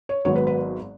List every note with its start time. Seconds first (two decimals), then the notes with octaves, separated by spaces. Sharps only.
0.09 C#5
0.25 G#1 G#2 F#3 B3 C#5
0.36 B4
0.47 B4